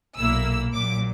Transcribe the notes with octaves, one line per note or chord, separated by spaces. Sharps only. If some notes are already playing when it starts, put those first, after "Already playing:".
B1 A#2 A#3 E4 E6
A#1 A#2 F#3 D6